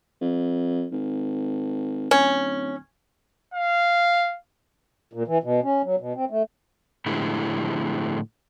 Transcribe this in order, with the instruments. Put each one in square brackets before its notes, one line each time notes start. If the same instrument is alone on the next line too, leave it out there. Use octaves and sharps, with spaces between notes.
[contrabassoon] F2
G#1
[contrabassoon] D1 [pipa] C#4
[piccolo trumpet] F5
[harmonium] A#2
E3
B2
C#4
F#3
B2
C4
A3
[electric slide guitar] A2 D3 F3 G#3 E4 G4